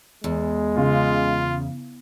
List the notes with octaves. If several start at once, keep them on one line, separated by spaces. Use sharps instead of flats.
E2 G#3
C#3 F4